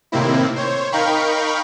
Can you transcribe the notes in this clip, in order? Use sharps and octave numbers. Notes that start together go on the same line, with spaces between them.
A2 C3 D#3 A#3 C4 E4
C5 C#5
D#4 A#4 F5 G5 B5 C#6